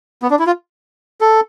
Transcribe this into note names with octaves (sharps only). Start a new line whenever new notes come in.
B3
D4
E4
F4
A4